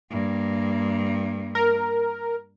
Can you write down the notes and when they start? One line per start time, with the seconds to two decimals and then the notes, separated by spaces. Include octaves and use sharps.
0.10 G2 A#3
1.55 A#4